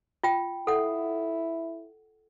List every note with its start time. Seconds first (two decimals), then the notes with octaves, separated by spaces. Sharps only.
0.24 F4 G5
0.67 E4 A4 F#5